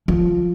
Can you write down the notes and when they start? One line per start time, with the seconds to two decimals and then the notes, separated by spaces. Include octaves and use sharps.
0.08 F3